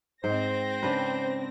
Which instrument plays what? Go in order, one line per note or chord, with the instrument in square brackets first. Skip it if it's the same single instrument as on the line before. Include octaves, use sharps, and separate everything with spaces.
[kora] G#2 [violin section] C4 A#6 [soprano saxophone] C5
[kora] C#3 D4 B4